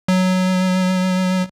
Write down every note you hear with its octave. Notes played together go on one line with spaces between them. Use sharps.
F#3